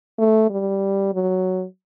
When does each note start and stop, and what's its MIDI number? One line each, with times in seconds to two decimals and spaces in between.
0.18 0.47 57
0.50 1.09 55
1.13 1.65 54